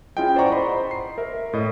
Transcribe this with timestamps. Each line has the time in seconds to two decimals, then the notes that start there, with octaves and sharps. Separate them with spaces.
0.17 C#4 E4 F4 G#4 D#5 G5
0.36 C5 D5 F#5 A#5 C#6
0.51 C5 D#5 B5 C6
0.91 C7
1.18 A#4 E5
1.53 A2 D#5